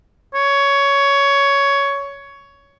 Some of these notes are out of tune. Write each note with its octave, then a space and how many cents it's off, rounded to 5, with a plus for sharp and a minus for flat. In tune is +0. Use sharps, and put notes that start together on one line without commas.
C#5 +15